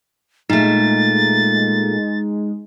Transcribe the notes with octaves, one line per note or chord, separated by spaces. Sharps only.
A#2 G#3 A3 D#4 A6